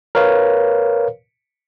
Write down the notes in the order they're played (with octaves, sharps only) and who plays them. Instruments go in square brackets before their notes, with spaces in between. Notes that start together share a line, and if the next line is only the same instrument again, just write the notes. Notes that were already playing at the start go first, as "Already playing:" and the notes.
[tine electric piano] A#4 B4 C#5 F5